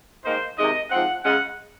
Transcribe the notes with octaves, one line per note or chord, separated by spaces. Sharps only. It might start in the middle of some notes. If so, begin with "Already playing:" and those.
G#2 D#3 A#3 D#4 C5
C3 D#3 G#3 D#4 D#5
G#2 F3 C4 F#5
C#3 G#3 C#4 F4 F#5